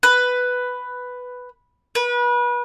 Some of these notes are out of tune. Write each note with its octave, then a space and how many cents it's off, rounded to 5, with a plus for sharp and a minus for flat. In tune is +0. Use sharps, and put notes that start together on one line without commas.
B4 +5
B4 -30